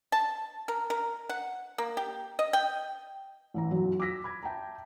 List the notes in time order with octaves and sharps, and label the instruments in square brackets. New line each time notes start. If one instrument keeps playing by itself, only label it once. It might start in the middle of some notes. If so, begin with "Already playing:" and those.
[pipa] A5
A#4
A#4
F#5
A#3
G4
D#5
G5
[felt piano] A1 E3 A#5
B1 F#2 F#3
D6 E6 A#6 B6
B5 G#6
E5 G5 A5 A#5